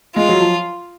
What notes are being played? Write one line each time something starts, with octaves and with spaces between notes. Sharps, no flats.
G#3 F4
F#3
F3